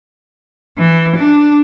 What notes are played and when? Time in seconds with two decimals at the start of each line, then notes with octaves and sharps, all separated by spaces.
0.78 E3
1.16 D4